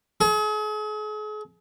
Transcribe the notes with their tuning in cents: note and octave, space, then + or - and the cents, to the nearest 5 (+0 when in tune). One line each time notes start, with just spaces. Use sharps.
G#4 +40